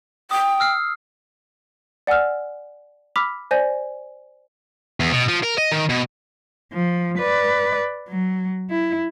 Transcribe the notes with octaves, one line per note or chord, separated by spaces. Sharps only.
G5 D#6
E6 F6 C7
D5 F#5 G#5 E6 F6
B5 D6 E6 F6 B6 F7
C5 D5 G#5 G6 A#6
E2
B2
F3
A#4
D#5
D#3
B2
F3
B4 D5
F#3
E4